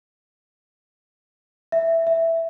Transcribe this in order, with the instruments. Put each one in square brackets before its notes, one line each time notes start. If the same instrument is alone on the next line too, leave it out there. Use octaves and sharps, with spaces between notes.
[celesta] E5
E5